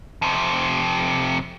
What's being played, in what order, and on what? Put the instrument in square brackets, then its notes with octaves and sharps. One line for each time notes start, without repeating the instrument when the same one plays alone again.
[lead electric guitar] F2 C3